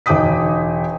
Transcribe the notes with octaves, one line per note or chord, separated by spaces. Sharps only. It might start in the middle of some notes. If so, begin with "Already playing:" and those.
E1 D#4 G5 D6 D#6 B6